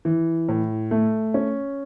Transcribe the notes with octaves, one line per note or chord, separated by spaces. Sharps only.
E3
A2
A3
C#4